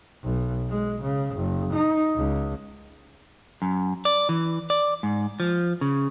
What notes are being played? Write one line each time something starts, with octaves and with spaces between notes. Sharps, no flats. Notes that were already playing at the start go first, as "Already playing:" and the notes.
B1
G#3
C#3
F#1
D#4
C#2
F#2
D5
E3
D5
G#2
F3
C#3